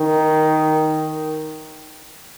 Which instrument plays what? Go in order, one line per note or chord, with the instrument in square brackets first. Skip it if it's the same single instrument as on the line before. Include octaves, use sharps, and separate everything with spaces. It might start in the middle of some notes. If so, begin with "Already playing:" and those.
Already playing: [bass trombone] D#3